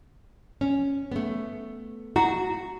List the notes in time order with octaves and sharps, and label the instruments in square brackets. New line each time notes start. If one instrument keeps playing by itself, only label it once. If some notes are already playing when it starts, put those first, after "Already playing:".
[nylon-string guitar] C#4
A3 B3
[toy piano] E4 F#5 A#5 [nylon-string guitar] F#4